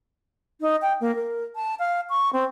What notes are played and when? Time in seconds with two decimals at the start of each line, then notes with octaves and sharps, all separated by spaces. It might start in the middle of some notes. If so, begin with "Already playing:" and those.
0.60 D#4
0.81 G5
1.00 A#3
1.15 A#4
1.55 A5
1.79 F5
2.09 C#6
2.33 C4